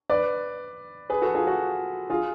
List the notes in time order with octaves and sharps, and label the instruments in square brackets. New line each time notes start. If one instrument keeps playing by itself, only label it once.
[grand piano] B4 D5
G#4 B4
F#4 A4
F4 G#4
F#4
F4 G#4